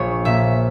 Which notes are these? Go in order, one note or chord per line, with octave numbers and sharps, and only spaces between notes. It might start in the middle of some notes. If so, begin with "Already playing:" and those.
Already playing: A#1 C#5
A#2 A#3 E5